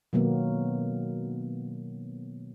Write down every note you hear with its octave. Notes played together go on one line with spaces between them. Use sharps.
B2 D#3 F#3 A#3 B3